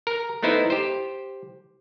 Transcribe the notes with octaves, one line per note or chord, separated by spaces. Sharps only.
A#4
A3 B3 D#4 E4 C5
G4 C5